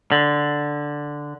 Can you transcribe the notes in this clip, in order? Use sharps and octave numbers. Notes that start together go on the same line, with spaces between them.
D3